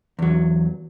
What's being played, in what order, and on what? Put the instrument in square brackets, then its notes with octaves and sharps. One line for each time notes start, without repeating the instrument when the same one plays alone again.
[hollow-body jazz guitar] E2 F#3